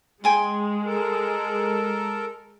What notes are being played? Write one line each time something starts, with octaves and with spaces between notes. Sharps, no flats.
G#3 G5 G#5 C6
A4 A#4